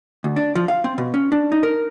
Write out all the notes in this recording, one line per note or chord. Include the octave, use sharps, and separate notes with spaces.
D2
D4
F3
F5
C4
B2
C#4
D4
D#4
A#4